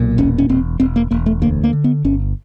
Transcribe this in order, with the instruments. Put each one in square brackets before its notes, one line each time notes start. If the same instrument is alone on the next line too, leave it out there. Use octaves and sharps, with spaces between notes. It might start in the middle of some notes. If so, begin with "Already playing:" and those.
Already playing: [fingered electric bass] B1 A#2
E1 C#4
C#4
E1 C4
E1 C4
A#3
E1 A#3
A3
D2 A#3
A#3
D3
B3
G1 C#4